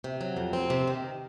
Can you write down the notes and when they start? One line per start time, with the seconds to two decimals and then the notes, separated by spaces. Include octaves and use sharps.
0.04 C3
0.21 F#3
0.37 F2
0.53 C4
0.70 C3
0.87 D#3